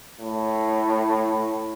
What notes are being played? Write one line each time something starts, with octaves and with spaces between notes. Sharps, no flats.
A2